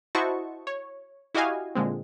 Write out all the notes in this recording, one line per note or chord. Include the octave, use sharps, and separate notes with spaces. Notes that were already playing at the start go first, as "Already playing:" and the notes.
E4 F#4 C5 D#5 A5 C#6
C#5
E4 F#4 G4 D#5 F5 G#5
A#2 D3 G#3 C4